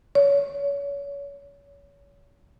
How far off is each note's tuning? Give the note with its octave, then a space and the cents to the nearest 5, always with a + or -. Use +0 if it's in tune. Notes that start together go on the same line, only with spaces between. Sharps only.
C#5 +30